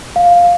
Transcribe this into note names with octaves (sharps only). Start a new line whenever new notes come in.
F5